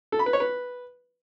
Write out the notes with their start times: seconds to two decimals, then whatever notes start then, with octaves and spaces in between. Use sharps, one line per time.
0.12 A4
0.19 B5
0.26 B4
0.33 C#5
0.40 B4